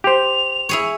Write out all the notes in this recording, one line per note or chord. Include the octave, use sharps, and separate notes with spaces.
G4 C5 F7
E4 G#4 C#5